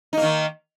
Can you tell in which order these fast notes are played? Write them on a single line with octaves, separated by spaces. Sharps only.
D#4 A#3 D#3